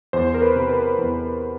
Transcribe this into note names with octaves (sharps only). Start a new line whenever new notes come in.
E2 C5
A#4
B4
C3
B4
E2